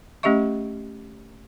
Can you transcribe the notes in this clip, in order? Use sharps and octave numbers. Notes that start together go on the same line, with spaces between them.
A3 C#4 G4 D#5 E5 C#6